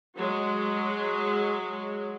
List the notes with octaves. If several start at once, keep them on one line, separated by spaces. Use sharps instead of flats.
F#3 G#3